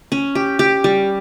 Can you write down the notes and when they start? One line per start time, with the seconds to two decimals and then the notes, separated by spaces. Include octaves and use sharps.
0.12 C#4
0.35 G4
0.59 G4
0.84 G3